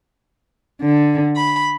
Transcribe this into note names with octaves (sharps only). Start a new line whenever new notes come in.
D3
B5